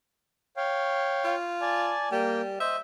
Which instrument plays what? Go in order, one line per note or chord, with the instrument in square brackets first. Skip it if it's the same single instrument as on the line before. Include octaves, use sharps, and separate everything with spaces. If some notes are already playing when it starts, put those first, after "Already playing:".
[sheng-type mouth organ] C#5 F5 G5
[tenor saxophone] F4
[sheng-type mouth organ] D5 G#5 A5
[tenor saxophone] G3 [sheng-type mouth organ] A#3 G5
[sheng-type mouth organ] C5 D#5 [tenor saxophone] E5